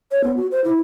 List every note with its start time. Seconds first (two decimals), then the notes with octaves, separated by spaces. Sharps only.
0.12 C#5
0.24 B3
0.36 F#4
0.52 C5
0.64 E4